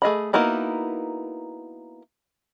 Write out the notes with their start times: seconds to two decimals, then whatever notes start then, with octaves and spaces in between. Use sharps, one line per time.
0.02 A3 G#4 D#5 B5
0.33 A#3 B3 D#4 E4 F#4